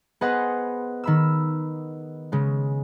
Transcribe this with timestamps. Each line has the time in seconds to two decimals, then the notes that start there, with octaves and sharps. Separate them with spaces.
0.21 B3 G#4 B4 C5 D#5 F#5
1.04 D#3 B5 E6
2.32 C#3 G#3